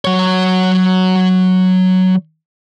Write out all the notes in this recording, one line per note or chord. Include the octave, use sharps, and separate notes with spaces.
F#3 C#5